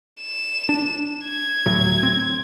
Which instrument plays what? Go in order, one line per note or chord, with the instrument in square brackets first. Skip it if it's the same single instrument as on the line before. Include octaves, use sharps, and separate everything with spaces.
[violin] E7
[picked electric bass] D4
[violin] G#6
[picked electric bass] D2 A2 F#3
C4